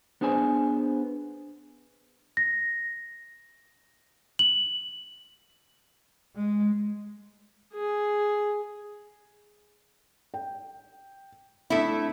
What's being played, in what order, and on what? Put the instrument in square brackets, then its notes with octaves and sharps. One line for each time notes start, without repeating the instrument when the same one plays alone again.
[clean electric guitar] B3 D4 G#4 C5 G#5
[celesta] A#6
F#7
[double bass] G#3
[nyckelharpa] G#4
[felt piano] G5
[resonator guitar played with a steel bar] A3 E4 [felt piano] C4 D4